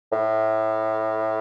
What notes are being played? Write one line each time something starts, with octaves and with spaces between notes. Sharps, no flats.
A2